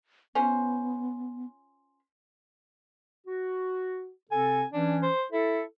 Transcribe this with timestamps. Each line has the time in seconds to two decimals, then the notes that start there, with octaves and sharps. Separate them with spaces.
0.35 B3 C#4 F4 C5
3.27 F#4
4.31 C3 C4 A4 G#5
4.73 E3 C#4 D4
5.03 C5
5.32 E4 A4